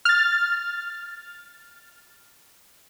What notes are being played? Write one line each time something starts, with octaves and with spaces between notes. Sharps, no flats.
F6 A6